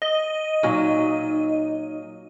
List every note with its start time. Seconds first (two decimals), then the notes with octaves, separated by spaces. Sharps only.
0.02 D#5
0.63 A#2 F#3 D#4